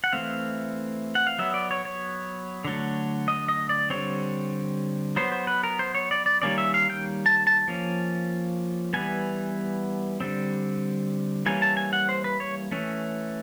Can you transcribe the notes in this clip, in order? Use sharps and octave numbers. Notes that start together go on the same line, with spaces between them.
F#5
E3 A3 C4 F5
F#5
F5
F#3 B3 E5
D5
C#5
C#5
D3 F#3 A3
D#5
D#5
D5
D3 G3 C4 C#5
F#3 B3 C5
C5
B4
A#4
C5
C#5
D5
D5
D#3 G3 A#3 C#4 D5
E5
F5
G5
A5
A5
F3 A#3 C#4
E3 G3 B3 G#5
D3 G3 C4
E3 G3 A#3 C#4 G#5
A5
G#5
F#5
C5
B4
C#5
E3 A3 C#4